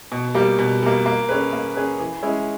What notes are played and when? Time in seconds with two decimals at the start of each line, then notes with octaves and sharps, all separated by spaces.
0.12 B2
0.35 G3 A#3
0.59 B2
0.82 G3 A#3
1.06 A#3
1.29 C#4 G#4 B4
1.53 A#3
1.75 C#4 G#4 B4
1.99 E3
2.23 G#3 C#4 E4 G#4